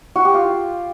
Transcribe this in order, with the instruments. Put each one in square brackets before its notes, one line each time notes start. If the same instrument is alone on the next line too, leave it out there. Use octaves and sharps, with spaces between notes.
[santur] F#4
G4
F4